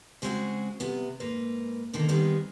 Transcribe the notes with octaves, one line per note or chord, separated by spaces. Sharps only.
C#3 G#3 B3 C4 F#4 G#4
C3 B3
G#2 A#3 B4
B2 D3 D#3 A#3
D#3 G3 B3 C4 G#4